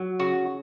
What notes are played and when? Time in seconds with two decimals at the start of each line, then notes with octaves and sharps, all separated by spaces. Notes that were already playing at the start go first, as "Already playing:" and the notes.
Already playing: F#3
0.19 C#3 F#4